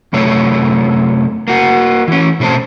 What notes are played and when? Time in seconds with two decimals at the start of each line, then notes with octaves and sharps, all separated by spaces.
0.13 F#2 C3 A3 A4 C#5
1.48 A#3 F#4
2.08 E3 C#4
2.40 B2 A3 C4 C5 A5